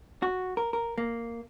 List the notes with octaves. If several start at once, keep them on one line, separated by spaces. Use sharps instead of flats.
F#4
A#4
A#4
A#3